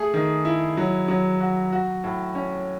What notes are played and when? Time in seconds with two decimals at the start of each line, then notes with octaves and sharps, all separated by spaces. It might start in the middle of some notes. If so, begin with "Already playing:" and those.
Already playing: A3 G#4
0.14 D#3
0.45 E4
0.77 F#3
1.08 F#3
1.40 F#4
1.72 F#4
2.04 A2
2.35 C#4